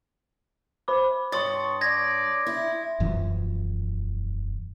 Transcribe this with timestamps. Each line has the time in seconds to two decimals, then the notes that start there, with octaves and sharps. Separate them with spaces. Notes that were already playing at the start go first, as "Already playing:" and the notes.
0.88 C5 B5 D6
1.32 G2 C#5 C6 C#6 D#6 A6
1.81 D5 G#6 A#6
2.46 E4
3.00 E1 F#2 E3 F3